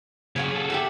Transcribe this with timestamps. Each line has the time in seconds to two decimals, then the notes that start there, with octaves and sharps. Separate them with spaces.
0.36 C#3 F#3 C#5 F5 F#5
0.51 G#4 A4
0.70 G4 E5 F#5